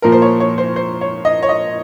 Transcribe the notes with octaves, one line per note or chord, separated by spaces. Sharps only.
A#2 F3 A#3 A#4
C5
C#5
C#5
C5
C5
C#5
D#5
C#5
D#5